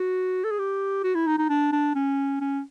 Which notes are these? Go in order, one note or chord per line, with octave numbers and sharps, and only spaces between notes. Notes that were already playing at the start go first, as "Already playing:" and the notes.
Already playing: F#4
A4
G#4
G4
F#4
E4
D#4
D#4
D4
D4
C#4
C#4